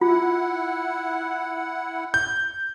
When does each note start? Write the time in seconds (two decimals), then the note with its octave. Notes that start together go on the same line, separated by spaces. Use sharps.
0.01 E4 F4 F#5
2.14 G6